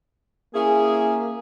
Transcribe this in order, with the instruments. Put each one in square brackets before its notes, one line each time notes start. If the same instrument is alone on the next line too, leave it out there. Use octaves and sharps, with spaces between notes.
[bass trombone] A#3 [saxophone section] C#4 E4 G#4